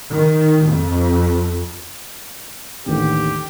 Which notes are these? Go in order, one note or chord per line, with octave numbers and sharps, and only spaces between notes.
D#3
F2
A1 D#2 D3 G4